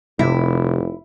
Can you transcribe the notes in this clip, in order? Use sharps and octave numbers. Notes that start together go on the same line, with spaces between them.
F1 C3 E4